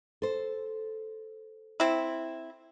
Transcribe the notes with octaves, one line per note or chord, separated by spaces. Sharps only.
A4 C5
C4 E4